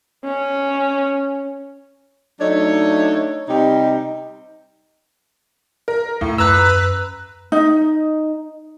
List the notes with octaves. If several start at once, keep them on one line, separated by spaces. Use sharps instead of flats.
C#4
F#3 A3 D4 D#4 C#5
C3 G3 D#4
A#4
D#2 A2
F#2 B4 A#5 E6 F#6
D#4